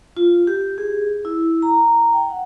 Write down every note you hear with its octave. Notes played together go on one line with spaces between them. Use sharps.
F4
G4
G#4
E4
A#5
G5
F#5